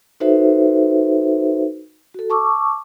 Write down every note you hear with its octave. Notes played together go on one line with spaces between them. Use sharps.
D#4 F#4 A4 B4 C5 E5
F#4 A4
A5 C#6 D6 E6